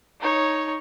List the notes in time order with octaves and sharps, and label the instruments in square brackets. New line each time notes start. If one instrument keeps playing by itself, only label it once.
[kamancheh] D#4 C#5